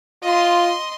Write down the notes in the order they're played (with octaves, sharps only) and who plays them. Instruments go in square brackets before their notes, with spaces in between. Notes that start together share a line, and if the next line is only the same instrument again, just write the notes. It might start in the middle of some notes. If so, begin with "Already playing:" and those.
[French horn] F4 [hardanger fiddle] D#5 C6